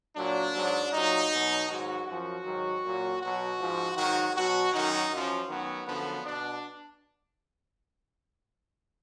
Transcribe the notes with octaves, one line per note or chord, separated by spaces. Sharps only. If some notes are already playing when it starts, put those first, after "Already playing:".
A#2 F#3 D4
G#2 F#3
A#2 F#3 D#4
B2 F#3
G#2 D#3 F#3 F#4
F#2 F3 F#4
G#2 D#3 F#3
A#2 F#3
B2 F#3 F#4
G#2 F3
G#2 D#3 F#3 F#4
B2 F#3 F#4
F#2 D#3 F#3 D#4
F#2 F3
F#2 D#3 F#3 B3
F#2 D3 F3 B3
B2 D4